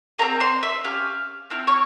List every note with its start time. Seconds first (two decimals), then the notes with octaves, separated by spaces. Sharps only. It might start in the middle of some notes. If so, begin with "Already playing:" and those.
0.18 C4 F4 G#4 A#4 A#5
0.40 C5 C6
0.63 E5 E6
0.84 C#4 G4 F5 F6
1.50 C4 E4 F6
1.67 C#5 C#6